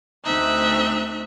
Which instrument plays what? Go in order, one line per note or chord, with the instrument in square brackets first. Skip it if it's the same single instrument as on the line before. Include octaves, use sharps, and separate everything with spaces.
[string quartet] D2 A3 C4 D#4 E5 F#6